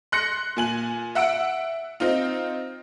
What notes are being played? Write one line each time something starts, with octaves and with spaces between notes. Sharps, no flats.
C6 F#6 A#6 C#7
A#2 G#5 F#7
E5 F#5 E6 D7
C4 D#4 F4